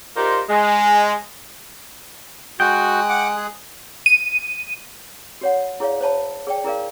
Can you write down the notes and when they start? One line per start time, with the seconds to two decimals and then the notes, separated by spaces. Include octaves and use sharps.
0.16 D#4 F4 G4 A#4 C5 D5
0.49 G#3
2.60 G#3 F#4 G5 D#6 F#6
3.09 F#5 D6
3.36 G#4
4.06 D#7
5.41 F#4 C#5 F#5
5.80 E4 G#4 C#5 D5 F5
6.01 C5 C#5 A5 B5
6.47 G#4 D5 G5
6.64 E4 G#4 A#4 D5 F5